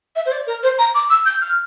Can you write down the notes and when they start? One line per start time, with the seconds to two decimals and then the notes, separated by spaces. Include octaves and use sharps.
0.16 E5
0.26 C5
0.32 D5
0.47 A#4
0.63 C5
0.79 A#5
0.95 D6
1.10 E6
1.26 G6
1.42 F6